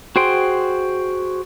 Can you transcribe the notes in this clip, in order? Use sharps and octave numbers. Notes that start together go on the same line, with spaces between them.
F#4 G#4 C5 G5 C6